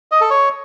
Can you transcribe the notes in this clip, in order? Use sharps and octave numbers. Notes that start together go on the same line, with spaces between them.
D#5
A4
C#5